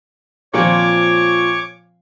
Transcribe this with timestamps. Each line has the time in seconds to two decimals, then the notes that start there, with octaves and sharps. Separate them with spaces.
0.54 A#2 F3 C4 C#5 C#6 D6